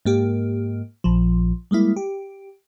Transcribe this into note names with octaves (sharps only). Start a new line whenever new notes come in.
G#2 A#3 G4
A#1 F3
G3 G#3 A#3 E4
G4